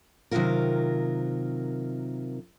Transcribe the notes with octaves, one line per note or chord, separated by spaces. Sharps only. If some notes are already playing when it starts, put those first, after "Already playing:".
C3 D#3 F3 F#3 F4 A#4